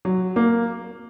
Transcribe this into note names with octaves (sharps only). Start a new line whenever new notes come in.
F#3
A#3